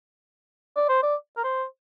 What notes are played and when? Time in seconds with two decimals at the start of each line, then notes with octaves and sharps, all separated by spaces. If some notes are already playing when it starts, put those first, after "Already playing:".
0.76 D5
0.89 C5
1.03 D5
1.37 A#4
1.44 C5